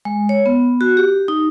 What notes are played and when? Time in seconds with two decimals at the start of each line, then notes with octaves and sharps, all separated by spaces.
0.05 G#3
0.29 C#5
0.46 B3
0.81 F#4
0.97 G4
1.28 D#4